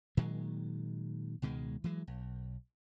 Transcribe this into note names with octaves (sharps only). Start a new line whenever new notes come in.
A#2 D#3 F#3 G#3
C#2 B2 D#3 G#3
E3 F#3 G#3
B1